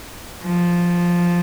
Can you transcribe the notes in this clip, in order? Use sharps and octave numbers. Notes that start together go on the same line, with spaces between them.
F3